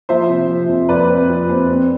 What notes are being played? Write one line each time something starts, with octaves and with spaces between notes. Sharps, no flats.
F3 C5 E5
C3
F3
F2
F2 B4 D5
C4
F3
C4
C4